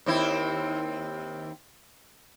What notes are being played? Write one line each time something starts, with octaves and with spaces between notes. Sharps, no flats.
D#2 C4 E4